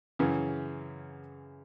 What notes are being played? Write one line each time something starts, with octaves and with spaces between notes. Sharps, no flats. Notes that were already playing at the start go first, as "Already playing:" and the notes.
F#2 C#3 E3